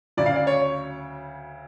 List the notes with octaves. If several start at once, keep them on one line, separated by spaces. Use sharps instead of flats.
D2 C#3 F#3 D5
F5
D5
C#5